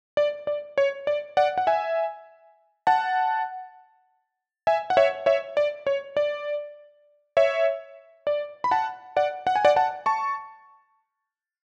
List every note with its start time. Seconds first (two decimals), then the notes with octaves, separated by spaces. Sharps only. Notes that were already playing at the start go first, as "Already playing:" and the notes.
0.17 D5
0.47 D5
0.78 C#5
1.07 D5
1.37 D5 F#5
1.58 F#5
1.67 E5 G#5
2.87 F#5 A5
4.67 E5 G#5
4.90 F#5
4.97 C#5 E5
5.26 C#5 E5
5.57 D5
5.87 C#5
6.17 D5
7.37 C#5 E5
8.27 D5
8.64 B5
8.71 F#5 A5
9.17 D5 F#5
9.47 F#5
9.56 G#5
9.65 D5 F#5
9.76 F#5 A5
10.06 A5 C#6